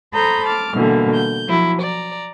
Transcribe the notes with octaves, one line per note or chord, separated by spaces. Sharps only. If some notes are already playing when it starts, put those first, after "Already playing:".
A4 C5 A#5 B5 D#6 G6
A5 D6 F6
B2 D3 E3 G3 A#3
G6
F3 F#3 E4
D5 A#5